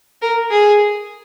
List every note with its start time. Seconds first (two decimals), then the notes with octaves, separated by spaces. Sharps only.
0.22 A#4
0.51 G#4